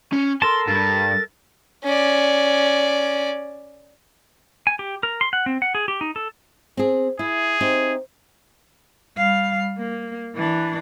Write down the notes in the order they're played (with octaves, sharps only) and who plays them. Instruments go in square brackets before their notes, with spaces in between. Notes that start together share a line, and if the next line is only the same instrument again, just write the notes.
[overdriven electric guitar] C#4
[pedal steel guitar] A4 A#4 A5 [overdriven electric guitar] C6
[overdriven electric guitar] G2 [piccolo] A6
[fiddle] C#4 D5
[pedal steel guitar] G#5
G4
A#4
C6
F#5
C4
F#5
G#4
G4
D#4
A4
[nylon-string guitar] C4 G#4
[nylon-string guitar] E4 [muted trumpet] G#4
[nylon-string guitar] C4 D#4 G4
[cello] G3 F5
A#3
E3 D4